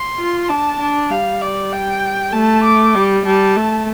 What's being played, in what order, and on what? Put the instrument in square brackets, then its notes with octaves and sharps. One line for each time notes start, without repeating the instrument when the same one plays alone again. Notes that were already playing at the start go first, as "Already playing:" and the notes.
Already playing: [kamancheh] C6
[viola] F4
[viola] D4 [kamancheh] A5
[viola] D4
[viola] G3 [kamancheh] F5
[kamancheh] D5
G5
[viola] A3 [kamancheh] A5
[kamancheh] D6
[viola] G3
[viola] G3 [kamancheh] A5
[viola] A3